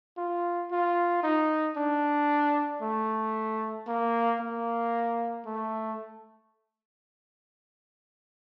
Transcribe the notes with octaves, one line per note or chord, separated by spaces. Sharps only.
F4
F4
D#4
D4
A3
A#3
A#3
A3